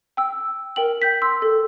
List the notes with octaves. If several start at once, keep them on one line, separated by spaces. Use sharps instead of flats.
G5 E6
A#4 G5 F#7
G5 G6 B6
C6 E6
A4